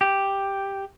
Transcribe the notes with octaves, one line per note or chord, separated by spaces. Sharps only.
G4